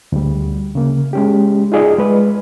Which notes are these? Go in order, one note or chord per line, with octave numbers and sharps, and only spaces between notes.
D2 G3
C#3 A#3
G#3 C#4 G4
D#4 F4 G#4 D5 D#5
G#3 B4